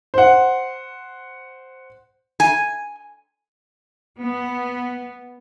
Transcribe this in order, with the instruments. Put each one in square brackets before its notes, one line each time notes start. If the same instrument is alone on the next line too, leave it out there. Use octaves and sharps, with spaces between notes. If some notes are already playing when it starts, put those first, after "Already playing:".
[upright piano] C5 F#5
[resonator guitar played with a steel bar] G#5
[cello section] B3